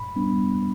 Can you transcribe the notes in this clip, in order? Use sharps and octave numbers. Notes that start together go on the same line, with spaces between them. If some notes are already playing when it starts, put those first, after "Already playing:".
Already playing: A2 B5
G3 B3 D4